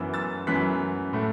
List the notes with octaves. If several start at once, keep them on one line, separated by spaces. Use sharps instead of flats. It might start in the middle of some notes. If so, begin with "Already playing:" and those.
Already playing: F#2 E3 B3 B5 E6
E6 A6
F#2 E3 B3 F#6 B6
A2 A3